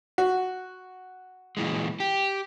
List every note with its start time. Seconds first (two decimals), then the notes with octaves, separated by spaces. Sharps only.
0.18 F#4
1.57 A#2 E3 G#3
2.00 G4